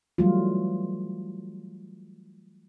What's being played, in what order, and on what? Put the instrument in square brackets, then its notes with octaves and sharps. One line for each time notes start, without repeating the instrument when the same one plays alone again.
[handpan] E3 F#3 G3 A3 F4